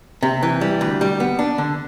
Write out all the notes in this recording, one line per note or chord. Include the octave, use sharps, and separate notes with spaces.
C3
E3
G3
D2
G3
B3
D4
D3